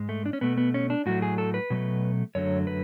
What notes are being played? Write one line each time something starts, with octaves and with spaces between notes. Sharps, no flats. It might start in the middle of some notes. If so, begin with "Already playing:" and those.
Already playing: G#2 G#3
A3
D4
C#4
B2 A3 B3
B3
C#4
D4
A2 F#3 A3 F#4
G#4
A4
B4
B2 F#3 A3
F#2 D3 F#3 A3 C#5
B4